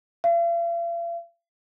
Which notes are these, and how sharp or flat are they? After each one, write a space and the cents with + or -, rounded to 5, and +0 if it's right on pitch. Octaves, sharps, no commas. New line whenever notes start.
F5 -45